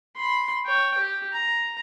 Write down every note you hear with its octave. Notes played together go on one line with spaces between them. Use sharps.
B5 C6
C#5 G5
G4
A#5